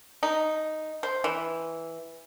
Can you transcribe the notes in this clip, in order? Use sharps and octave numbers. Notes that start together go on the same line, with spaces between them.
D#4
C5
E3